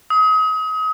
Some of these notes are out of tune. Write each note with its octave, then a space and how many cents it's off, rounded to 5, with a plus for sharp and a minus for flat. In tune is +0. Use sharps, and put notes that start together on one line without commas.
D#6 +35